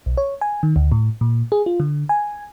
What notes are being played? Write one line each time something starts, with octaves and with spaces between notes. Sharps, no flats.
B1
C#5
G#5
D#3
D2
A2
A#2
G#4
F4
D3
G#5